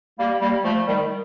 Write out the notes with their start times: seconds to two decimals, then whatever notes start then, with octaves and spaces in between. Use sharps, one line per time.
0.19 G3 A#3
0.41 G3 A#3
0.64 F3 A3
0.87 D#3 G3